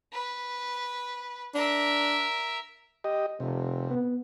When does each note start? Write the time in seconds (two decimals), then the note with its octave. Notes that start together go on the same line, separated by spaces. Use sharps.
0.12 B4
1.55 D4 A#4 E5
3.04 G4 D#5
3.40 F1 C3
3.90 B3